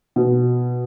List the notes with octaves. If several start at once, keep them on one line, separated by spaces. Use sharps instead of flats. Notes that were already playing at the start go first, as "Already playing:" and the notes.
B2